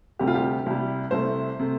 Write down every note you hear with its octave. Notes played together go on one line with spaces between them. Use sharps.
D2 C3 G3 G4
F4
G4
C2 C3 G3
C2 C3 A3 C5
C3 A3